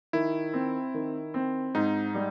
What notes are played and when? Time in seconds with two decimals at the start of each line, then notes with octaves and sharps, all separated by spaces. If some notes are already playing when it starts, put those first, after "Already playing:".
0.13 D#3 E4
0.53 C4
0.94 D#3
1.34 C4
1.75 G#2 D#4
2.15 G3